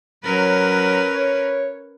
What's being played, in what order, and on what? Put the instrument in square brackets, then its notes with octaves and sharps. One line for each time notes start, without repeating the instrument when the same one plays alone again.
[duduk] F#3 [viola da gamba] C#4 A#4 B4
[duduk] C#5